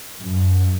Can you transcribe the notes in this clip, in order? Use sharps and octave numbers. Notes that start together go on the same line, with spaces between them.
F#2